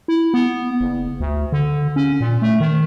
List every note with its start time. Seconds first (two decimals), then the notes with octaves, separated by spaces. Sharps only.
0.08 E4
0.34 B3
0.81 F#1
1.20 D2
1.52 D3
1.96 C#4
2.21 A#2
2.42 A3
2.60 D#3